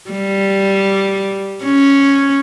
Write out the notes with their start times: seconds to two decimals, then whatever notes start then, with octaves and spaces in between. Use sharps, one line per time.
0.11 G3
1.64 C#4